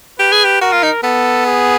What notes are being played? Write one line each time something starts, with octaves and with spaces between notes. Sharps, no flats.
G4 B4
G#4
G4
F#4 A#4
F4
D#4
B3 A4
G#4